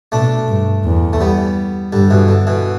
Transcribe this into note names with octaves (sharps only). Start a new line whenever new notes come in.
B2 A3 D4
G2
E2
A3
G3 B3
G2 D3 G3
B2 E3
D3
B2 E3